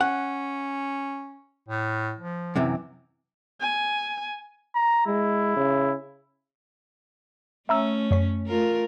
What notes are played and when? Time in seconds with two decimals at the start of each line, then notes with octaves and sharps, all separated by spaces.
0.01 C#4 F#5
1.68 A2
2.19 F3
2.56 F#2 C3 E3
3.61 G#5
4.75 A#5
5.07 G#3 E4
5.57 C#3
7.69 A3 C#4 E5 A#5 E6
8.11 F#2 C#5 B6
8.47 A3 F4 A#4